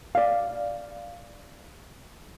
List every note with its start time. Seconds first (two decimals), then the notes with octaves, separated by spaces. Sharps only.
0.15 D5 F5